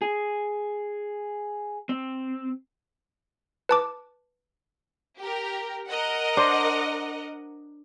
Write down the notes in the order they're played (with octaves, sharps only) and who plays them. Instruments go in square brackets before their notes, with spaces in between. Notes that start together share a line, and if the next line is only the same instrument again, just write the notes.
[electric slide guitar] G#4
C4
[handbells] B4 A5 D6
[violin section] G4 A#4
A#4 D#5 F#5
[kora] D4 C5